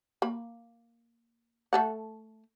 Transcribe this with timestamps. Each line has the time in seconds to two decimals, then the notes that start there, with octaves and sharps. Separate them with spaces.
0.22 A#3 B5
1.73 A3 A4 F#5